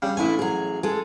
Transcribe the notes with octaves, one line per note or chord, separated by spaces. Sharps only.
C#3 G3
A1 A3 D4 E4 G#5
F#3 G#4
G#3 G#4 A4